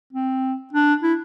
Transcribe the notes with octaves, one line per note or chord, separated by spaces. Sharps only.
C4
D4
E4